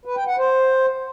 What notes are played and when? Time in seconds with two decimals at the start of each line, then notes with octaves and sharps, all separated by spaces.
0.05 B4
0.16 G5
0.27 F#5
0.38 C5